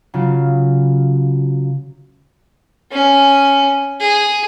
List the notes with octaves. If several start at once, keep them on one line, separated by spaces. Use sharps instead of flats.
C#3 F#3 F4
C#4
G#4